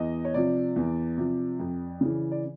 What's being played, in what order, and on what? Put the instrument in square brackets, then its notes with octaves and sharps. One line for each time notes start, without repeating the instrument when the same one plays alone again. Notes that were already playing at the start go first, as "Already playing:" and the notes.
Already playing: [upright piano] E2 D#5
C#5
C3 F3 D5
E2
C3 F3
F2
C#3 E3
D5